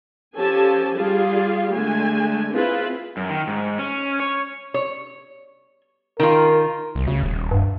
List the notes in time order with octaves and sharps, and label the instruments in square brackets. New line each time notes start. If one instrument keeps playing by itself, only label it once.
[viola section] F3 C#4 G4 A4 G#5 A5
G3 F4 G#4 F5
D3 G#3 A3 G#5
C4 E4 F4 G#4 B4
[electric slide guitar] F#2
D#3
G#2
C#4
C#5
[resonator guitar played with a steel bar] C#5
[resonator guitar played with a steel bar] D#3 F4 [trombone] A#4
[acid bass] C2
[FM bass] D2 [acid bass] C#3
[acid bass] D#1
[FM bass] G2